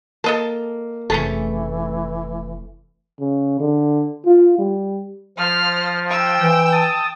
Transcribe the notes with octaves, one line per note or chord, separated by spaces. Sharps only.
A#3 A4 D#5 A5
F1 E3 A3 C#4 G#4 A5
C#3
D3
F4
G3
F3 C5 F6
G5 E6
E3
A5 D#6